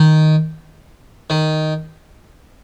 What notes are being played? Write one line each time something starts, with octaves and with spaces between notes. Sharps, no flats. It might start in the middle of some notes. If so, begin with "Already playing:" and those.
Already playing: D#3
D#3